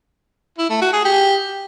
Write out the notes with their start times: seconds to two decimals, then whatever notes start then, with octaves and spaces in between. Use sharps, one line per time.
0.58 E4
0.70 A3
0.81 F#4
0.93 G#4
1.04 G4